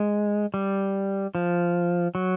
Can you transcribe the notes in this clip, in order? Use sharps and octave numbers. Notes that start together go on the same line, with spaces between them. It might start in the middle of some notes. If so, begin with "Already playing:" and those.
Already playing: G#3
G3
F3
F#3